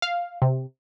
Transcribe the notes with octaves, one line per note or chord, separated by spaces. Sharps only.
F5
C3